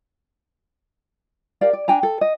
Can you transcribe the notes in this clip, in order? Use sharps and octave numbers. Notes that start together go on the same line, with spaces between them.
G4 A#4 D5 F5
D5
D4 G5 G#5 A#5
A4
D#5